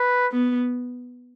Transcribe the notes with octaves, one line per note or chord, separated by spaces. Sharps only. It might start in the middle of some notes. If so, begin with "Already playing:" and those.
Already playing: B4
B3